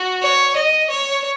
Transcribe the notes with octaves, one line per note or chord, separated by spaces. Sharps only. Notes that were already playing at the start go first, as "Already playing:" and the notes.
Already playing: F#4
C#5
D#5
C#5